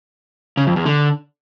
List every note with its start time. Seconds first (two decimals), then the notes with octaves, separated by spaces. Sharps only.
0.57 C#3
0.67 F2
0.76 E2
0.86 D3